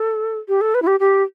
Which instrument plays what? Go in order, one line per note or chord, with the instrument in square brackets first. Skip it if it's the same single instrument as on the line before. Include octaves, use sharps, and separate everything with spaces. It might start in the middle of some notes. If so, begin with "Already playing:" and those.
Already playing: [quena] A4
G4
A4
B4
E4
G4
G4